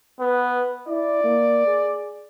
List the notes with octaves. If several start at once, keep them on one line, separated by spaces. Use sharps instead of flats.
B3 B4
E4 D5
A#3
G#4